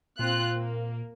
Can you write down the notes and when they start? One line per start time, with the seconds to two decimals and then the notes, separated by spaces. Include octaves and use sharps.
0.19 A#2 C4 F4 F#6
0.57 A#3